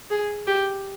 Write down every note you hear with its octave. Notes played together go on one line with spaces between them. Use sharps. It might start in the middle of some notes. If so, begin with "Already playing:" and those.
G#4
G4